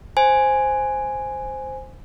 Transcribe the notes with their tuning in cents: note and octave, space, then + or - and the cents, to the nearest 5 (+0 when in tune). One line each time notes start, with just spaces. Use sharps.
C5 +0 G#5 +0